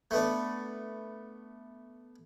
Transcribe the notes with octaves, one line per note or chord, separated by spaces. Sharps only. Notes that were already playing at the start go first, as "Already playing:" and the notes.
A3 B3 D4